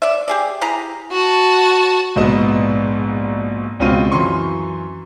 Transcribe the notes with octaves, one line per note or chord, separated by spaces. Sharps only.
D5 E5
G4 G#4 D5
E4 G4 G#4 A#5
F#4 A5
A#1 G#2 B2 B3 D#5 E7
C#2 B2 C4 C#4 F4 D#7
F#2 E3 C6 C#6